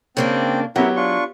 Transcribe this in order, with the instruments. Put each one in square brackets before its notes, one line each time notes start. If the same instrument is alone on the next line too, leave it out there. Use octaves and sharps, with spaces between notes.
[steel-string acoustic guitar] C#3 A#3 D4 [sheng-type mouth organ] C4 G5
[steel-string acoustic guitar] F#3 [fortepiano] B3 G4 F#5 [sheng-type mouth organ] E4 A#4
[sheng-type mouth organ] D4 F4 C#6